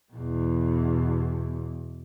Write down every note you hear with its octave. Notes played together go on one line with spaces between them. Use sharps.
E2 B2